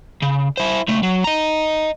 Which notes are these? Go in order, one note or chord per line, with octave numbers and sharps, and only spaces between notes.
C#3
E4 C5
C#2 A3
F#3
D#5 A#5